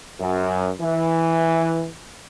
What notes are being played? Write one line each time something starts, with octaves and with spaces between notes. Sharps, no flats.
F#2
E3